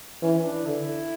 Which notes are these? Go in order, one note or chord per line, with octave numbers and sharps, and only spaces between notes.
E3 C#4
D4
D3 E4